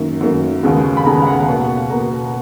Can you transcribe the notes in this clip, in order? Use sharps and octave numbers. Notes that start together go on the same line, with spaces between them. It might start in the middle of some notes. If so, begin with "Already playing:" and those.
Already playing: F#2 D#3 A#3
F#2 D#3 A#3
D#2 C#3 G#3 B3
B5
D#2 C#3 G#3 B3 A#5
F5
F#5
B2 A#3
B2 A#3 A#5